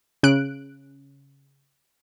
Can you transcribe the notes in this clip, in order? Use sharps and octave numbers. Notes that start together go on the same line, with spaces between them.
C#3 F#6 D7